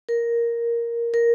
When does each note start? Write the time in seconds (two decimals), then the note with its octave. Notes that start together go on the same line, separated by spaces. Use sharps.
0.09 A#4
1.14 A#4